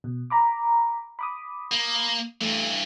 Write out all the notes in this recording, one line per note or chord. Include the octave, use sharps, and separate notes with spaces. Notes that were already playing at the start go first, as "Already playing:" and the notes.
B2
A#5 B5 D6
B5 D6 D#6
A#3
G2 E3 A3